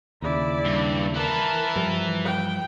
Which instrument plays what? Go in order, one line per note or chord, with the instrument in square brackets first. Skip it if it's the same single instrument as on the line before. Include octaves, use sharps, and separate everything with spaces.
[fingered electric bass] D#2 C#3 [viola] E4 D5
[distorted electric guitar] G2
[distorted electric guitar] E4 B4 [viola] A#4 A5
[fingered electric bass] G2 F3 G3
[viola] G5